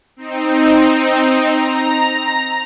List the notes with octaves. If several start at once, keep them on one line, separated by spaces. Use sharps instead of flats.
C4 D#4
A#5